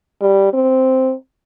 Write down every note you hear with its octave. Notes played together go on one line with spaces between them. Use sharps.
G3
C4